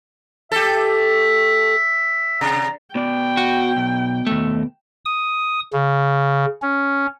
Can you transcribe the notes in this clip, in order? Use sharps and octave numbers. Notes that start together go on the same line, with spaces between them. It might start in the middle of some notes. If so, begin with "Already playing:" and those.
G4 A4 E5
E5
C3 A#5
B2 B3 D5 G5
F#4
B1
D#2 A3
D#6
C#3
C#4